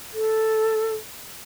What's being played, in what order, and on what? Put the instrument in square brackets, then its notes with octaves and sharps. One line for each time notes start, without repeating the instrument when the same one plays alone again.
[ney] A4